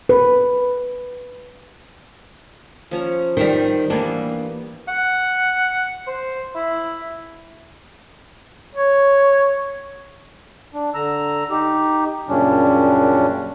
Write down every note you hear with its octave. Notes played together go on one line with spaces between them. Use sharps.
B4
F3 C#4 A#5
D#3 G3 C5 A#5
E3 G3 A#3 B3 D4
F#5
C5
E4
C#5
D4
D3 A#5 E6
D#4 G4
F#2 A#2 C#3 G3 C#4 D4